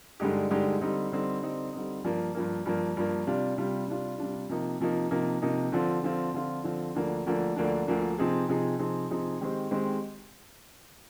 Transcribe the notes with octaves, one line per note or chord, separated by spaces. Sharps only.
G2 D3 G#3 D#4 G4
G2 D3 G#3 D#4 G4
D3 G3 C4 D#4
D3 G3 C4 D#4
D3 G3 C4 D#4
D3 G3 C4 D#4
G2 F3 A#3
G2 F3 A#3
G2 F3 A#3
G2 F3 A#3
C3 G3 D4 F4
C3 G3 D4 F4
C3 G3 D4 F4
C3 G3 D4 F4
C3 F3 A#3 D#4
C3 F3 A#3 D#4
C3 F3 A#3 D#4
C3 F3 A#3 D#4
D3 F3 C4 F4
D3 F3 C4 F4
D3 F3 C4 F4
D3 F3 C4 F4
D2 D3 F3 A#3 D4
D2 D3 F3 A#3 D4
D2 D3 F3 A#3 D4
D2 D3 F3 A#3 D4
C3 F3 C4 D#4 G#4
C3 F3 C4 D#4 G#4
C3 F3 C4 D#4 G#4
C3 F3 C4 D#4 G#4
D#3 G#3 C4 G4 C5
D#3 G#3 C4 G4 C5